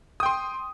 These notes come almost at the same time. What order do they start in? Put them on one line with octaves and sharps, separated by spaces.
D#6 G5 C6